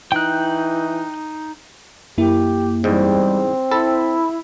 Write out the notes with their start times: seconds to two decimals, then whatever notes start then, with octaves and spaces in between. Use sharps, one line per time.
0.12 E3 D#4 G5 F#6
2.18 F#2 A#3 E4 G4
2.84 E2 G#2 G3 C4
3.71 E4 A4 B5